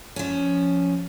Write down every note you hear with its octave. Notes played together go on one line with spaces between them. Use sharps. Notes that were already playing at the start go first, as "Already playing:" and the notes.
F3 C#4